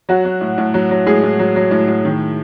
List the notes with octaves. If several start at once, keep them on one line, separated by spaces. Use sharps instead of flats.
F#3 F#4
F#3
A2
A2
F#3
F#3
A2 G#3 G#4
A2
F#3
F#3
A2
A2
D#3